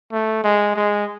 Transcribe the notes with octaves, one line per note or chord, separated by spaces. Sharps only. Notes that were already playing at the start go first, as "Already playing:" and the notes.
A3
G#3
G#3